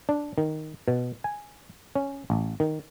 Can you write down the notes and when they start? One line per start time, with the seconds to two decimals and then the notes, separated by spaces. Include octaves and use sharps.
0.09 D4
0.38 D#3
0.88 B2
1.24 G#5
1.96 C#4
2.30 A1
2.60 D#3